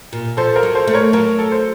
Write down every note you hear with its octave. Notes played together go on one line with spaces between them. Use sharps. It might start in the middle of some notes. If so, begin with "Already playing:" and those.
A#2
F3 A4 C5
A#4
F#3
A4 C5
A3
A#4 C#5
F#3 A#4
A4
C5